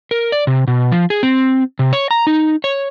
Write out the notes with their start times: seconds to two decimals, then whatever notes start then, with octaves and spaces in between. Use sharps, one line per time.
0.11 A#4
0.32 D5
0.47 C3
0.68 B2
0.92 F3
1.10 G#4
1.23 C4
1.79 C3
1.93 C#5
2.11 A#5
2.27 D#4
2.64 C#5